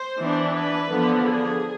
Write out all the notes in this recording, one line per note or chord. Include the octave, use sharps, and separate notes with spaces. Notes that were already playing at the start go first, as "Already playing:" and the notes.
Already playing: C5
E3 B3 D4
B4
D3 F3 B3 D4
G#4